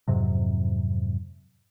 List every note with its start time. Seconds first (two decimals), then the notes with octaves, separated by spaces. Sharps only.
0.08 F2 G#2 C3 F#3